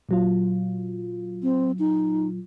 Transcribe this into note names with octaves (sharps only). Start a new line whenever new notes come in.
A#2 F#3 F4
C4
D#4